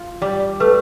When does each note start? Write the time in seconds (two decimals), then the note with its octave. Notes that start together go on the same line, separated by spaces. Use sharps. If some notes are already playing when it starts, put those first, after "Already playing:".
Already playing: F4
0.22 G3
0.60 A3 B4